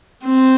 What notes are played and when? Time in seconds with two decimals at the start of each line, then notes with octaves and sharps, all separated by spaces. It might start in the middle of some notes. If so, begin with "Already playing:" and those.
0.26 C4